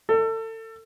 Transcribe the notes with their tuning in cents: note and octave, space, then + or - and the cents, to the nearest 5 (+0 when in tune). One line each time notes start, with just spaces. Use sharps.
A4 +30